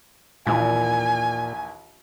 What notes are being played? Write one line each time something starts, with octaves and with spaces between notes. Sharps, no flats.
A#1 D#2 A#2 E3 G#5